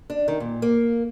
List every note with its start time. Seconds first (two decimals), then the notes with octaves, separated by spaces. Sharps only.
0.10 D4
0.28 D#3
0.40 A#2
0.62 A#3